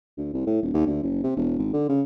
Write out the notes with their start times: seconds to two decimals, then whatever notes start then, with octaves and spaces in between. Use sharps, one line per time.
0.17 D2
0.34 C2
0.47 A2
0.62 D#1
0.74 D#2
0.86 D2
1.03 F#1
1.23 C3
1.36 E1
1.58 G#1
1.73 D3
1.89 C#3